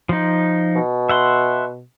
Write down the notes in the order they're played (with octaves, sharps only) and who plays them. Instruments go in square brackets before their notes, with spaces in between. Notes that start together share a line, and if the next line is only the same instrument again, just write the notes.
[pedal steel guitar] F3 D#4
[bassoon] B2
[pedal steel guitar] E5 F#5 C6